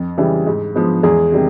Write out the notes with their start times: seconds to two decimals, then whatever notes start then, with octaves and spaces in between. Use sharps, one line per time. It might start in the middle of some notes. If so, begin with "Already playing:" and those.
Already playing: F2
0.18 C#3 E3 G3
0.47 G#2
0.75 F3 G#3 B3
1.03 E2 G#3 G#4
1.32 C3 D#3 G3